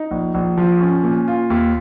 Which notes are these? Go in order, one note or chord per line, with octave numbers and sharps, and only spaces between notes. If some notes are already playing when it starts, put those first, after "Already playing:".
Already playing: D#4
A#1
A#1
F3
C#4
A#2
F4
D#2